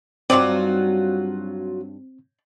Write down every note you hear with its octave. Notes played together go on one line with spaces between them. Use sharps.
G2 F#3 C4 D#4 F4 F#4 C#5 D5